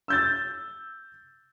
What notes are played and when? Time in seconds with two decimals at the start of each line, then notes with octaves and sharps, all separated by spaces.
0.08 E6 G6 A6